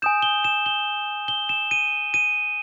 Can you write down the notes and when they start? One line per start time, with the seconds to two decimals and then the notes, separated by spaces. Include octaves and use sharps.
0.02 G#5 D#6 G6 E7
0.22 G7
0.44 E7
0.66 G7
1.28 G7
1.49 E7
1.71 D#7
2.14 D#7